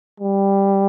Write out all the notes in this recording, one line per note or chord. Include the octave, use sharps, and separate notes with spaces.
G3